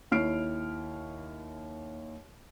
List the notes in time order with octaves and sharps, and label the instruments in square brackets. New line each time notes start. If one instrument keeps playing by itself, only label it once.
[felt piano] D#2 E4 C#5 F6 C7 D7